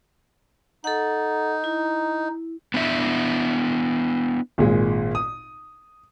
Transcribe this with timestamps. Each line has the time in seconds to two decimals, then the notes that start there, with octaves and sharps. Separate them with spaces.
0.84 D#4 A4 F#5
1.64 E4
2.74 B3 D4 E4 E5
4.58 G#1 A#2 G#3
5.15 D#6